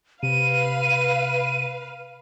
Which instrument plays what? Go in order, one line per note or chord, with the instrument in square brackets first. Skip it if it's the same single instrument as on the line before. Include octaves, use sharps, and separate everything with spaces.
[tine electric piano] C3 [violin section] B4 F5 [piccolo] D#7